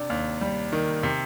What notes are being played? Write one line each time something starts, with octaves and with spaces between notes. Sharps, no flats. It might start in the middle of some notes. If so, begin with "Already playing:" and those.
Already playing: C3 D4
D#2
G3
D#3
C3